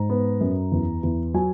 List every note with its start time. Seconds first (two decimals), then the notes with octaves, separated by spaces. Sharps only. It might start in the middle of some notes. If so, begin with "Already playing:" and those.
Already playing: G#2 A#5
0.10 B3
0.41 F#2
0.72 E2
1.03 E2
1.34 F#3 G#5